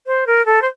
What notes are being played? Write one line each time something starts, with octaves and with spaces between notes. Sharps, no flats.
C5
A#4
A4
C5